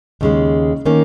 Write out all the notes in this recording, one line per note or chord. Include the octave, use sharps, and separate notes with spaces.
D#2 C#3 G#3
D#3 A#3 C#4